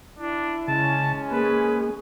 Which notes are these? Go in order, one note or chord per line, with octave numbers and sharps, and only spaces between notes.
D4 E4
C#3 G#3 C#4 A5
A#3 G#4 B4